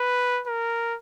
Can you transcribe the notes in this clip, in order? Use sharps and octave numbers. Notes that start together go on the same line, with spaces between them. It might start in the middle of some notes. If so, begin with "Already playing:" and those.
Already playing: B4
A#4